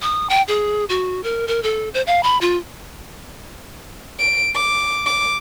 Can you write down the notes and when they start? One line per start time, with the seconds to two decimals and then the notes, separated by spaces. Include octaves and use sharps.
0.02 D#6
0.30 G5
0.48 G#4
0.89 F#4
1.23 A#4
1.48 A#4
1.63 A4
1.94 C5
2.07 F5
2.23 B5
2.41 F4
4.19 D7
4.55 D6
5.06 D6